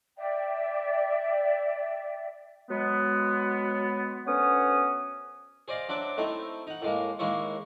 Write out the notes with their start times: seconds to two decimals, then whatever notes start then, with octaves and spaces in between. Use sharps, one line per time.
0.17 D5 E5 G5
2.71 F#3 G#3 B3
4.27 D2 B3 C#4 C#5 F#5 D#6
5.68 G#4 C5 D5 D#5 F5
5.89 F#3 D4 C5 E5 D6
6.18 A3 C4 D#4 E4
6.67 D#4 F#5
6.82 A2 G#3 A#3
7.19 D#2 G#3 A#3 E4 C#5